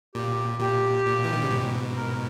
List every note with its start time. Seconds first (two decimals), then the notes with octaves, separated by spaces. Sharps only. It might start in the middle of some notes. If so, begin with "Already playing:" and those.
0.15 A#2 G4
0.60 A#2 G4
1.06 A#2
1.24 E3
1.33 D#3
1.42 C#3
1.50 G#2 B2
1.96 A#4